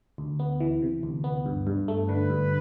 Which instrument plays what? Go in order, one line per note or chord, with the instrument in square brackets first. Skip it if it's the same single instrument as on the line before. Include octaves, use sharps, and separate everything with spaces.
[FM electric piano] D2
B3
E3
C3
D2
B3
G2
G2
A3
[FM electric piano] D3 [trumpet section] B4
[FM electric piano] G2